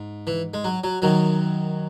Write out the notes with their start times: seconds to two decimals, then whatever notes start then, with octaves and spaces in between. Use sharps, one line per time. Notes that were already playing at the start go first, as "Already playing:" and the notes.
Already playing: G#2
0.27 E3
0.54 G#3
0.64 F#3
0.84 F#3
1.02 F#2 D#3 F#3